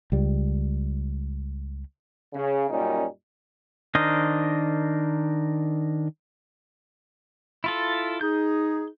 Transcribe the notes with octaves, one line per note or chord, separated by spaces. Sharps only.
C#2 G3
C#3
F#2 A#2 G3 C#4 D#4
D#3 D4 A#4 C5 D#5
E4 F4 A4
D#4 G#4 G6